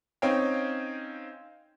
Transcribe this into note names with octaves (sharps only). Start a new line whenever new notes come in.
C4 C#4 D#4 C#5 F5 G5